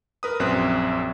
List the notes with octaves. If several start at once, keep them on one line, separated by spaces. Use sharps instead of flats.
A#4 B4 D#6
A#1 F#2 C4 F#6